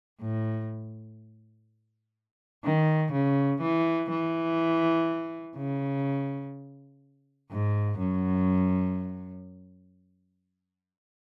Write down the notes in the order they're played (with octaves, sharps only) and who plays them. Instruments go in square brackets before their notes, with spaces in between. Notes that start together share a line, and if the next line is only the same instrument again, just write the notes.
[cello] A2
D#3
C#3
E3
E3
C#3
G#2
F#2